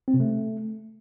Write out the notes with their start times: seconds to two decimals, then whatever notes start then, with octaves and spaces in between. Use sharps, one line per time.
0.08 C4
0.14 C3
0.20 A3